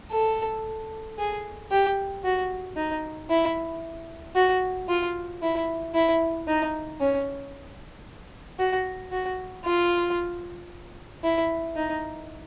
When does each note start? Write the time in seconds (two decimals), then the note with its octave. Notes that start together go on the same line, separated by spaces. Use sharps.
0.12 A4
1.19 G#4
1.71 G4
2.24 F#4
2.76 D#4
3.30 E4
4.36 F#4
4.89 F4
5.42 E4
5.94 E4
6.47 D#4
7.00 C#4
8.59 F#4
9.12 F#4
9.65 F4
11.24 E4
11.76 D#4